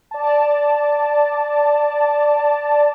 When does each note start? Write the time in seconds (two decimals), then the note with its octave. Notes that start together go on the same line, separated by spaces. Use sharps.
0.11 D5 A5